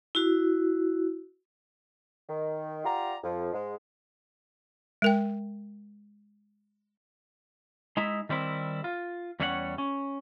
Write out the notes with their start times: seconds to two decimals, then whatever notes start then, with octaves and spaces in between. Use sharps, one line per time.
0.15 E4 F#4
2.28 D#3
2.85 F4 G4 D5 F#5 A#5
3.23 F2 F3
3.53 G#2 G#3
5.02 G#3 A#4 G5
7.97 G#3 D#4 E4 E5
8.29 D#3 G3 C4 E4
8.84 F4
9.40 E2 G3 C#4 C#5 E5 F#5
9.78 C#4